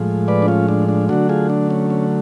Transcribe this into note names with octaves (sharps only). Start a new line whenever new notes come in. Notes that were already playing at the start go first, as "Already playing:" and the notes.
Already playing: A2 F3 G#3
B4 D5
D4
C#4 F4
D4
D4
D3 F#3 A3 D4 F#4
F4 G#4
D4
C#4
C#4